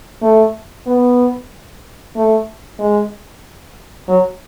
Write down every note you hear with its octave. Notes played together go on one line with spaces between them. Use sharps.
A3
B3
A3
G#3
F#3